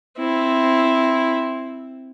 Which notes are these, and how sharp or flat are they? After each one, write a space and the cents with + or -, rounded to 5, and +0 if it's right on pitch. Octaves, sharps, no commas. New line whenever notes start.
C4 +0 E4 +0